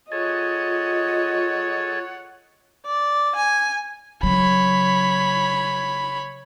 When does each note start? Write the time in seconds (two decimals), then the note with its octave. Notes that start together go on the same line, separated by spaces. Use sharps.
0.12 F4 G#4 A4 C#5 D#5 F#5
2.86 D5
3.35 G#5
4.23 C#3 F#3 C#5 B5